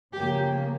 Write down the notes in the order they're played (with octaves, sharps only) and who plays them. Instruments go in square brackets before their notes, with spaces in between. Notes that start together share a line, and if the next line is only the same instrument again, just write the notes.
[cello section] C#3 F3 A#3 G4